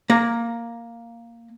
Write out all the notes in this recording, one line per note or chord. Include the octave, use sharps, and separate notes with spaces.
A#3 A#5